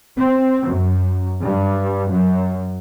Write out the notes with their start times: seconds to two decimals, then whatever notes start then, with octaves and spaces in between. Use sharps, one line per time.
0.17 C4
0.67 F#2
1.42 G2
2.10 F#2